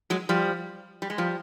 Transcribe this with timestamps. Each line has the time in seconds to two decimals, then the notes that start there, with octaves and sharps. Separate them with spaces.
0.10 F#3 G#3
0.29 F3 G3
1.02 G3
1.10 G#3
1.18 F3 G3